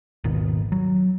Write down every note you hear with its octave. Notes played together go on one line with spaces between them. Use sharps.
G#1 D#2 B2 D#3
F#3